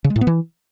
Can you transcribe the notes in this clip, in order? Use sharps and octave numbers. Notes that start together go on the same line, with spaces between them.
C#3
G#3
A2
B3
E3